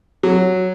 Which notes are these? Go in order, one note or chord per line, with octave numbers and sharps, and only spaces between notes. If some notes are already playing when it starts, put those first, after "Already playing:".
F#3